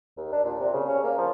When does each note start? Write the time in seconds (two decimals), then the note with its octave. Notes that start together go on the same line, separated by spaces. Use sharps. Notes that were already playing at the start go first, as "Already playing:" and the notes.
0.18 D#2
0.32 D4
0.45 A#2
0.59 C3
0.73 C#3
0.88 C#4
1.04 A#3
1.18 F3